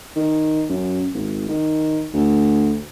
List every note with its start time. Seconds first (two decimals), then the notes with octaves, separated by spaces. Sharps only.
0.16 D#3
0.69 F#2
1.14 G#1
1.49 D#3
2.14 D2